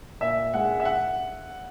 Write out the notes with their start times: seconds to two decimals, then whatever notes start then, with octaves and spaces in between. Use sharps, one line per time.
0.21 A#2 E5
0.54 G#3 F#5
0.80 E5
0.85 F#5